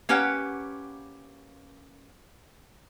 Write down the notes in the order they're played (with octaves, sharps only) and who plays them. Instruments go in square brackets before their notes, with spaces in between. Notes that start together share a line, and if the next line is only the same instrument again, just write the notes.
[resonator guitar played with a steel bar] A#3 C#4 G4 B4 F#5